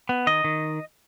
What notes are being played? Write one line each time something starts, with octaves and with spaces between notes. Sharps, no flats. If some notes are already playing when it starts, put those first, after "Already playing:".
B3
D#3 D#5
D#3